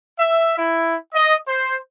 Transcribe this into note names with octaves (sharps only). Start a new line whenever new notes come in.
E5
E4
D#5
C5